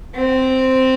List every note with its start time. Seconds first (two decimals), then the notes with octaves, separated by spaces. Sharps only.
0.15 C4